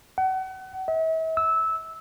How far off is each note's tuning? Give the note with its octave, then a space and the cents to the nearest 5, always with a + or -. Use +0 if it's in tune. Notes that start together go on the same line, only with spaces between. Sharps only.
F#5 +35
E5 -40
E6 -15